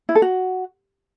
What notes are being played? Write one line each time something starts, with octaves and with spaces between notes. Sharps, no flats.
E4
A4
F#4